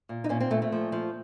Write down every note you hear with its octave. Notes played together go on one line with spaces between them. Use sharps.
A#2
D#4
A#2 C#4
C4
A#2 A3
A3
F3
F3